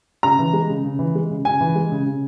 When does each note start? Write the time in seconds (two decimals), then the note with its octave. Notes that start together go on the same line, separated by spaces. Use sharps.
0.23 C#3 A#5
0.39 E3
0.53 G#3
0.69 C#3
0.84 C#3
0.99 E3
1.15 G#3
1.30 C#3
1.45 C#3 G#5
1.61 E3
1.75 G#3
1.91 C#3
2.06 C#3